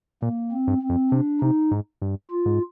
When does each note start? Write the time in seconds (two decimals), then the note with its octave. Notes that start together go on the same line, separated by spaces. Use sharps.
0.22 A#2 A#3
0.52 C4
0.68 G2
0.82 C4
0.89 F2
1.11 C3 D4
1.41 C3 D#4
1.71 G#2
2.02 G2
2.31 F4
2.46 G#2